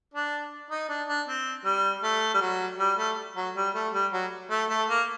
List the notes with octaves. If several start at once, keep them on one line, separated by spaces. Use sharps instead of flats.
D4
D#4
D4
D4
C4
G3
A3
G3
F#3
G3
A3
F#3
G3
A3
G3
F#3
A3
A3
A#3